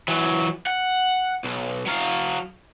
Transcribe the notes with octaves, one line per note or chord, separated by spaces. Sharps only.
E3 F#3
F#5
B1
F#3 F5